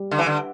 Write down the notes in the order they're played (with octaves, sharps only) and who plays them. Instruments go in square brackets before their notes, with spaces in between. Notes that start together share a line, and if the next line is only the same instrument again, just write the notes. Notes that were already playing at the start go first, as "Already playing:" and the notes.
Already playing: [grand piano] G3
[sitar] D3
E3
D3